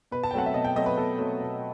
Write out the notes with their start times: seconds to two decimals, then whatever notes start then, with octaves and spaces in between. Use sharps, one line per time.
0.11 B2 B4
0.23 A5
0.31 G5
0.34 F#3 A3 C4 F#5
0.46 E5
0.54 B2 D#5
0.65 G5
0.76 F#3 A3 C4 D#5
0.86 B4
0.97 B2 A4
1.18 F#3 A3 C4
1.40 B2